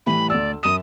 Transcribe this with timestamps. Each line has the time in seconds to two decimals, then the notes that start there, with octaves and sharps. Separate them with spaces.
0.06 A2 E3 G3 B5
0.30 D2 D5 E6
0.63 F#2 D#6 E7